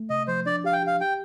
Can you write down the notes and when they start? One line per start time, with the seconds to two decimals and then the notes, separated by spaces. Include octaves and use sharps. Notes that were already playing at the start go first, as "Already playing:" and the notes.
Already playing: A3
0.10 C3 D#5
0.28 F3 C5
0.46 D4 D5
0.64 G4 F5
0.73 G5
0.82 G4 F5
1.01 G4 G5